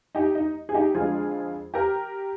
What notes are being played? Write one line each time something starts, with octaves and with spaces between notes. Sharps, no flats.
D#4 G4
D#4
G#4
D#4 G4
F2 D3 F3 G#3 F4 G#4
G4 A#4